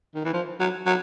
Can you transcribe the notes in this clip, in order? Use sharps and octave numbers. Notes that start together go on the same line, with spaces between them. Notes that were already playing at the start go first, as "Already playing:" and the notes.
D#3
E3
F3
F#3
F#3